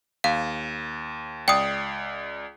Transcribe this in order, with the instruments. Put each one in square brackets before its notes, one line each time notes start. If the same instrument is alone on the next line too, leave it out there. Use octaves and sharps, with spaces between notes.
[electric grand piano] D#2 [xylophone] F5
[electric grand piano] C#2 D5 C7 [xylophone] G5 D#6